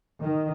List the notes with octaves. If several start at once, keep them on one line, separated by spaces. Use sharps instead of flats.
D#3